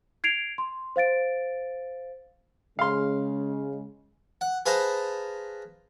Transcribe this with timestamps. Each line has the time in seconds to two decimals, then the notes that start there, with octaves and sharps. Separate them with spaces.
0.24 G#6 C7 D7 F7
0.58 C6
0.96 C5 F5 A6 D7
2.79 C#3 G#3 F5 C6
4.41 F#5
4.66 G#4 B4 C5 F5 A5 A#5